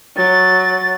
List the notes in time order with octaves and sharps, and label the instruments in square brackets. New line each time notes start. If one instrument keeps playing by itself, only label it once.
[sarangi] F#3 [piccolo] A6